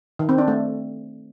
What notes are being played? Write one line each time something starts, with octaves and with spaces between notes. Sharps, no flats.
D#3
C4
D4
A3